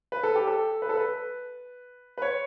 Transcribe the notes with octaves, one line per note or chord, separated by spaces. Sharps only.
B4
A4
G4
A4
B4
A4
B4
B4
C#5